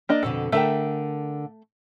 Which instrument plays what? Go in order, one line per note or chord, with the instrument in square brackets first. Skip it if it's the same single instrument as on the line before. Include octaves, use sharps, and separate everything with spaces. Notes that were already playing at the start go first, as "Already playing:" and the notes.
[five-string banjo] A#3 D4 D#5
[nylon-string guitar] F2 B2 D3 [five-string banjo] A4
[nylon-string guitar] D3 A#4 G5 [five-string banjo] A3 E5